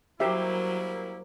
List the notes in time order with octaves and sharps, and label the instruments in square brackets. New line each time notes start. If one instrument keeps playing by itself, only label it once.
[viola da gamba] F#3 [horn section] G3 A#3 E4 [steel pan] G4 E5 [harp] A#4 C5